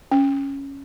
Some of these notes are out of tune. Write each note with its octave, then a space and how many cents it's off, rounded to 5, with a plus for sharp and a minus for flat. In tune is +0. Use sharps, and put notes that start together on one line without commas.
C#4 +0